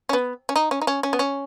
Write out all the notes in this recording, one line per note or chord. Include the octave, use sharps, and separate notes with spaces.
C#4
B3
C#4
D#4
C#4
D#4
C#4
C#4
B3
C#4